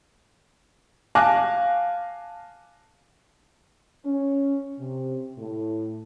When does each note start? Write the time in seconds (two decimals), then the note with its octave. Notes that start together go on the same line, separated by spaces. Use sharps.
1.15 F5 G#5 A5 D6 F#6 A#6
4.05 C#4
4.79 C3
5.37 A2